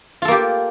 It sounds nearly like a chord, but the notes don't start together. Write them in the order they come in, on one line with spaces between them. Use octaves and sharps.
F4 A4 A#3 G4